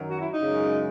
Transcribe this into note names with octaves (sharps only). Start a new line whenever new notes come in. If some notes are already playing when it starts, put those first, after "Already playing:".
Already playing: F#2 D#3 F#3
F#4
E4
D#4
F#2 C#3 G#3